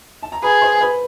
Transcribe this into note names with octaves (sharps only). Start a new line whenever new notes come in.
A5
A#5
G#4 B4 B5
C5 C6
B4 B5